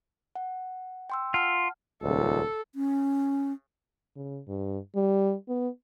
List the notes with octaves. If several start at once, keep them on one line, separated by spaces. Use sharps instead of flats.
F#5
G5 C6 E6
F4 F#5 A5 F6
D#1 C#2 A4
C#4
C#3
G2
G3
B3